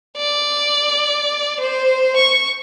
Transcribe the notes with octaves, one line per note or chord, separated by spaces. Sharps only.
D5
C5
C#6